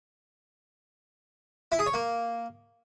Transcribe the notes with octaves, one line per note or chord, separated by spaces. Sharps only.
E4
G#4
C#5
A#3